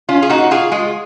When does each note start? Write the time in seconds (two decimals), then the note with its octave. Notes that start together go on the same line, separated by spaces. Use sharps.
0.09 C#4 F4
0.22 G#4
0.29 A#2 D#4 F#4
0.51 F4 G#4
0.72 G#3 F4 G#4